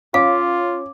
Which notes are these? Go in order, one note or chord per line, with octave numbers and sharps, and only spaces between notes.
C#4 F4 F5 D6